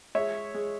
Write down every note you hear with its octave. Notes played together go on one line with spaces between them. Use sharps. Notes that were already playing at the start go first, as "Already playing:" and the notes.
G#3 C#5 E5
G#3